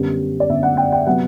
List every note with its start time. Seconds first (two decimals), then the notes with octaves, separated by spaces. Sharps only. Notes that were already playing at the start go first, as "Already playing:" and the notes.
Already playing: F#2 D3 G3 B3
0.40 D5
0.49 F#2 D3 G3 B3 E5
0.63 F#5
0.77 G5
0.92 G5
1.06 C3 F#3 B3 F#5